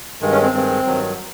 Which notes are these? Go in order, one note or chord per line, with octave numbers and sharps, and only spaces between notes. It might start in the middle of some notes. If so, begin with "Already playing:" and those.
G2 D#3 G#3
C#4
C4
G2 D#3 G#3 C4
G2 D#3 F#3